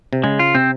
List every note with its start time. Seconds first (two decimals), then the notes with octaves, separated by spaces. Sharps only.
0.13 C3
0.24 C#3 G#3
0.39 F4
0.55 C3 C4